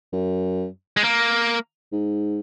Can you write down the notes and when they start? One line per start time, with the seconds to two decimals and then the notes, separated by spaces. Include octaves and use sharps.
0.13 F#2
0.97 G#3
1.04 A#3
1.93 G#2